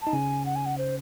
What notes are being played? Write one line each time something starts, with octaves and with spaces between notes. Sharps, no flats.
D#4 A5
C#3 C#4 G#5
F#5
G#5
F#5
C5